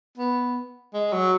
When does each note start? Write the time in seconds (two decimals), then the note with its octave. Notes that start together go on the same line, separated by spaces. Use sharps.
0.18 B3
0.94 G#3
1.13 F#3